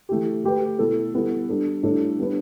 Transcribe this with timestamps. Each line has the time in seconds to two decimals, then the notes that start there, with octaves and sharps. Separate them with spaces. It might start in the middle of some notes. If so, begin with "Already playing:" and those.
0.09 E3 A3 E4 G4
0.44 A3 G4 B4
0.79 B2 A3 E4 A4
1.13 G3 B3 E4 A4
1.49 G3 D4 A4
1.83 A2 G3 D4 A4
2.19 G3 B3 D4 B4